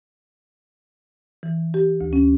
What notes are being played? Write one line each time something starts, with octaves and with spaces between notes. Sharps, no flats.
E3
G4
D2
C#4